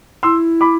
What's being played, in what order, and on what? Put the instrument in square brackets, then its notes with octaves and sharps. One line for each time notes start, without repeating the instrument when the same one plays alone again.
[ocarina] E4 [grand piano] C6 E6
[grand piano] B5 D6